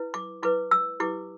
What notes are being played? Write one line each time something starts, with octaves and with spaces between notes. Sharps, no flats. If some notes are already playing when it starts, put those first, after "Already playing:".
Already playing: E4 B4
D6
E4 B4 D6
E6
E4 G4 B4 D6